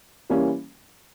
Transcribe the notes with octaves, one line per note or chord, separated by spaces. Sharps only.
E3 G3 A#3 C#4